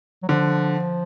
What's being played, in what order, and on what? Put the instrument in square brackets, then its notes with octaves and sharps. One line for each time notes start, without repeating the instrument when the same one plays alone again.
[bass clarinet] F#3
[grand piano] D3 [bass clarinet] F3